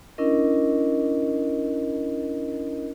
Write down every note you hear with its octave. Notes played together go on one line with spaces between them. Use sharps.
C#4 D4 E4 A#4 D#5